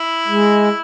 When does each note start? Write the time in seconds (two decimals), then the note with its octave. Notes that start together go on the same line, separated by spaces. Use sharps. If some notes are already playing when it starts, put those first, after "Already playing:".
Already playing: E4
0.28 G#3